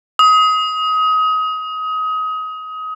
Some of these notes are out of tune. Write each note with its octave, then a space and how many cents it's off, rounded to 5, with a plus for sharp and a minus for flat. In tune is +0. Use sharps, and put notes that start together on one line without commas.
D#6 +25